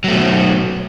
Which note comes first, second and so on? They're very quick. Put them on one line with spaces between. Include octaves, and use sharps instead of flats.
F#3 A3 B2